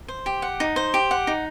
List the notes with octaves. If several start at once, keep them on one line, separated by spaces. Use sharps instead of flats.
C5
G4
F#5
D#4
C5
G4
F#5
D#4